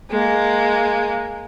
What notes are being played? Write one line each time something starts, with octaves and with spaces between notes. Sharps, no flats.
G#3 A#3